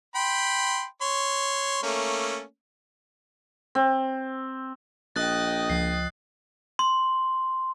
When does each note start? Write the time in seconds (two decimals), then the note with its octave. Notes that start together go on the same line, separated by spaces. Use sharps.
0.15 G5 B5 C6
1.02 C#5 C6
1.83 A3 A#3 C#4
3.75 C4
5.16 A#1 D#5 G5 D#6 F#6 A6
5.70 C#2 F3 C7
6.79 C6